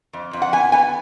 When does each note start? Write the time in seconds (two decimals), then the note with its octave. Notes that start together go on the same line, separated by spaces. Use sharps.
0.13 F2
0.33 F2
0.42 F#5
0.52 B3 G#5
0.72 B3 G#5